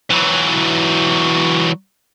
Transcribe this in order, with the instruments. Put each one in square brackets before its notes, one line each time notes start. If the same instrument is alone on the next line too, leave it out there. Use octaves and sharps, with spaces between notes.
[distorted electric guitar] E3 F#3